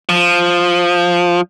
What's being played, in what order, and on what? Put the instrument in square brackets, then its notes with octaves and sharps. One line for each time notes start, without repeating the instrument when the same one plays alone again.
[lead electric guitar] F3